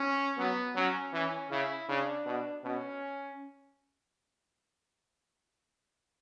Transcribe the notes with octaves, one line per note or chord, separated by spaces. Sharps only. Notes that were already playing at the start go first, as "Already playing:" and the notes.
Already playing: C#4
F#3 B3
F#3 C#4
E3 C#4
C#3 E4
C#3 D4
B2
B2 C#4